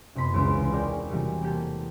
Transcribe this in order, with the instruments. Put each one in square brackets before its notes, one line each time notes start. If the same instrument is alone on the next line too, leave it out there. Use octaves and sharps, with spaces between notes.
[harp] F#1 C3 B3 B5 C6
E1 C#2 G#3 B4 C6 D7
G#4 A#4 D5 G5
C#6
C3 E3 F#3 G3 A3
A#3 G4 A4